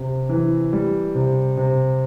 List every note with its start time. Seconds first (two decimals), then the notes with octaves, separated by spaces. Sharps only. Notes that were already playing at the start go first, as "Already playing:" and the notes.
Already playing: C3
0.29 E3
0.73 G3
1.15 C3
1.57 C3